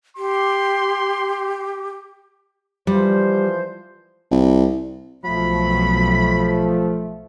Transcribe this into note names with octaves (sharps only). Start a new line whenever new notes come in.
G4 C6
E3 F3 G3 C5
C2
B1 F3 F#3 A3 B5